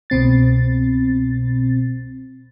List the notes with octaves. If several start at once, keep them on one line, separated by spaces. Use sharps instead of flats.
C2 B2 C4 A6